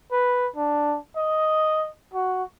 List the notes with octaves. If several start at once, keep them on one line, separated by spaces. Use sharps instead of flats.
B4
D4
D#5
F#4